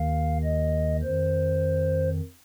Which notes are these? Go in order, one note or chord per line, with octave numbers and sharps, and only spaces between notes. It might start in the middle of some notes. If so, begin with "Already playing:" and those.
Already playing: D#2 D#3 F5
D#5
F2 D#3 C5